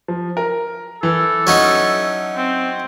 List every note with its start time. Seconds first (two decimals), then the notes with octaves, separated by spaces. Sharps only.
0.08 F3
0.37 A#4
1.03 E3 A4
1.47 F#3 C#4 D#4
2.37 C4